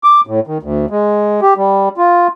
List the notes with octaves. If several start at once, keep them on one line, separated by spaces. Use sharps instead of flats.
D6
A2
D#3
D2
G#3
G4
G3
F4